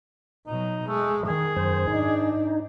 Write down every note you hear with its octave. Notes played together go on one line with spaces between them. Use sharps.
B2 F#3 D#4
G#3 A3
D#3 G#4
F#2 C5
G#2 D4 D#4